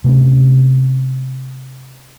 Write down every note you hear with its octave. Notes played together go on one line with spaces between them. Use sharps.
C3 A3 B3 C#4